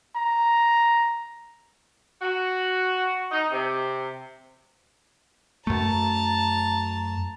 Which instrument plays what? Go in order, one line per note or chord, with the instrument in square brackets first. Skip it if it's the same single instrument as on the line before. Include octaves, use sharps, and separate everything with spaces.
[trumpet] A#5
[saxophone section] F#4
D#4
C3
[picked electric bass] F#2 A3 [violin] A5 A#5